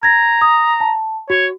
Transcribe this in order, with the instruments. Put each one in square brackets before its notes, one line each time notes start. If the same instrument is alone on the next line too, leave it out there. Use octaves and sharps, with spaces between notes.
[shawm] A#5 [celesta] G#6 A#6
[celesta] D#6
A5
[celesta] F#4 [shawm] C#5